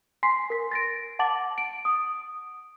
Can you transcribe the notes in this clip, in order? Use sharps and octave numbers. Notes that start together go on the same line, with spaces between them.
G#5 C6 B6 C7
A#4 B6
A6 A#6 D7
F#5 A5 D6 A6 F#7
D7
D#6